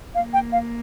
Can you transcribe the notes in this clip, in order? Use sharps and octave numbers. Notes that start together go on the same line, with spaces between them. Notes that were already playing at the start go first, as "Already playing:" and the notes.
A#3 F5
G5
F5